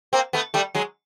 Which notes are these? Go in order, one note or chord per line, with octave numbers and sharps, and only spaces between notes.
A#3 C4
A3 B3
G3 A3
F#3 G#3